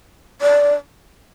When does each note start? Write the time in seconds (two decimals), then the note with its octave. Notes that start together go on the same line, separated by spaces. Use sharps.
0.42 D5